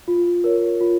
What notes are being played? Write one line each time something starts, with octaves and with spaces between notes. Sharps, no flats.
F4
A#4 C#5
F4